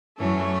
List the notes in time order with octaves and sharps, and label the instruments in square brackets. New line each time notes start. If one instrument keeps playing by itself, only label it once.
[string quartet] F#2 E3 A3 C#4